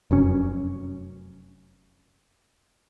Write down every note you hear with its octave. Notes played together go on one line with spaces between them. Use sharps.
F1 F#2 C#4